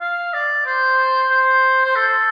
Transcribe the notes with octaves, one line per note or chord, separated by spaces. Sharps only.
F5
D5
C5
C5
C5
A4